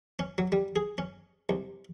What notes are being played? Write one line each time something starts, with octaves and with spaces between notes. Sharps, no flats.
C#4
F#3
G3
G#4
C#4
C2